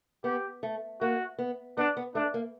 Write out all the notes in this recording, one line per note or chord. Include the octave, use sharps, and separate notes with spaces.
B3 G4
A3
A#3 F#4
B3
B3 D4
B3
A3 D4
A#3